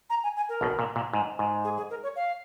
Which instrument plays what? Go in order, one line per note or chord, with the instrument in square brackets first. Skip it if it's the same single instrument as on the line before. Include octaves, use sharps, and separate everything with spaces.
[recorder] A#5
G#5
G#5
A#4
[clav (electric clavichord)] B1 B2
A#2
A#2
G#2
G#2
[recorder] G#4
G#4
A#4
C#5
F5